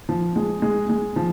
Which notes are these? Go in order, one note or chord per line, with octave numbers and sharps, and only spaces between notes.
F3
G#3
G#3
G#3
F3